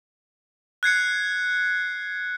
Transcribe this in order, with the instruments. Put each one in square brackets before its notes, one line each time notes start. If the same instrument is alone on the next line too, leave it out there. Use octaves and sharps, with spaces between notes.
[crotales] F#6 G#6 C7 C#7